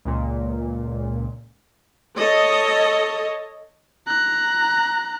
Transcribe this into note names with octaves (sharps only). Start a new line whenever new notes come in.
C#2 A#2
A4 C#5 D#5
A#5 F#6